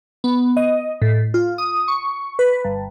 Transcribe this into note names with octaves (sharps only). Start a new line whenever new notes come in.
B3
D#5
A2
F4
D#6
C#6
B4
G1